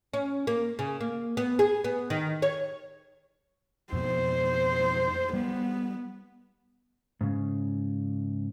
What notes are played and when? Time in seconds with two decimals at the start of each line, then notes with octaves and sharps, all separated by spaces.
0.14 C#4
0.47 A#3
0.79 C#3
1.01 A#3
1.37 B3
1.59 G#4
1.84 B3
2.10 D#3
2.42 C#5
3.93 F2 B2 C5
5.33 G3 B3
7.21 G#2 C#3